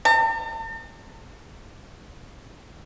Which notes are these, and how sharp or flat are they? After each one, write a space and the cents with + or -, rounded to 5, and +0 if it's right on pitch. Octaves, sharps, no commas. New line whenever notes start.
A5 +45